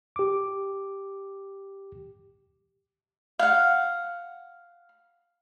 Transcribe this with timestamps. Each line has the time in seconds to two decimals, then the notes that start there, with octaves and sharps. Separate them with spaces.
0.16 G4 D6
3.39 F5 F#5